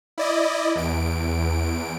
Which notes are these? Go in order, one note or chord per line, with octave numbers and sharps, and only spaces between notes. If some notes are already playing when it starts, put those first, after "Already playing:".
E4 D5 D#5
E2 D7